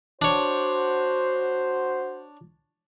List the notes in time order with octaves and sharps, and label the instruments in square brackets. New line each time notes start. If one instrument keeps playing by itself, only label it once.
[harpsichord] D4 C#5 [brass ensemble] F#4 C5